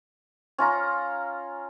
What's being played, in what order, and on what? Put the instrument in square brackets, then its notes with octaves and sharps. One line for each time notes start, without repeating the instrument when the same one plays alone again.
[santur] C#4 F4 A#5